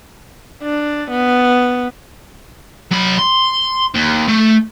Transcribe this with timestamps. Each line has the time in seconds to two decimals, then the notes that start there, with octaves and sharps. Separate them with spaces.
0.62 D4
1.11 B3
2.92 F#3 B5
3.19 C6
3.94 D#2
4.28 A3